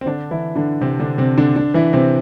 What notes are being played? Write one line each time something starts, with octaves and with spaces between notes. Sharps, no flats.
C4
D3 D4
E3 E4
D3 D4
C3 C4
D3 D4
C3 C4
D3 D4
D3 D4
E3 E4
C3 C4